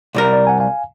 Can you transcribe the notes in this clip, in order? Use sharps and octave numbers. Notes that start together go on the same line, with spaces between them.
C2 G3 A#4
D5
F#5 G#5 A#5
F5 G#5